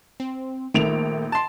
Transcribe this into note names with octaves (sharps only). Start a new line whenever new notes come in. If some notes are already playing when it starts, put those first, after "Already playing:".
C4
A#1 D#3 A3 D7 F7
A5 C6